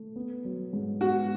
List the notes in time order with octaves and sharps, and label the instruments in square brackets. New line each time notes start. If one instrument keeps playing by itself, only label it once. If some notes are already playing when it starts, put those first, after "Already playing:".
Already playing: [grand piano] A3
B3
F#3
G#2
[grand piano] B3 [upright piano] F#4